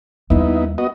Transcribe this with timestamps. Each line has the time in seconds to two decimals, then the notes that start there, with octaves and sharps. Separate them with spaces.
0.30 D#2 G3 B3 D#4 E4
0.78 B3 F#4 D#5